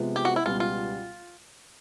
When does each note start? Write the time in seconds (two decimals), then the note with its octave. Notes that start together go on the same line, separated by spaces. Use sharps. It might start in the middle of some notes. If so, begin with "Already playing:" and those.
Already playing: C3 F3 G#3 B3
0.16 G4
0.25 F#4
0.36 E4
0.46 C#2 B2 G3 B3 F4
0.60 F4